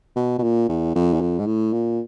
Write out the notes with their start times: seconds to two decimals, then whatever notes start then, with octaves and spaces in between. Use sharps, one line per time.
0.16 B2
0.38 B2
0.43 A#2
0.69 E2
0.95 F2
1.14 E2
1.21 F2
1.39 G#2
1.46 A2
1.73 A#2